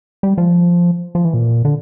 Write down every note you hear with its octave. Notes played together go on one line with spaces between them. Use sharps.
G3
F3
F3
E3
A#2
D3